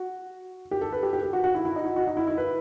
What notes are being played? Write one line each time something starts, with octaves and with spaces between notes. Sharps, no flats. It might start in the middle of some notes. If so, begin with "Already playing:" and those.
Already playing: F#4
G4
A4
B4
G4
G4
G4
F#4
F#4
E4
E4
D#4
F#4
F#4
D#4
E4
E4
B4